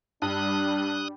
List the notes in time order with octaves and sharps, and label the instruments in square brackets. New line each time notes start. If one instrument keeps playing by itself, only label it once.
[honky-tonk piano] G2 [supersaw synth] G3 [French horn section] D4 [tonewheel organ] D#6 F#6